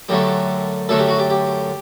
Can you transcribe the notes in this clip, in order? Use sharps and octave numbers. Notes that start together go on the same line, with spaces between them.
F#2 D3 F#3 A3 G4
F#2 D3 F#3 A3 A4
G4
F#4
G4
G4